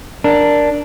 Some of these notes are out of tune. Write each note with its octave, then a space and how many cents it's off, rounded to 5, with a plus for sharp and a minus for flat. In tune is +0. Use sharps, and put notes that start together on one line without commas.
D4 +0 A#4 +0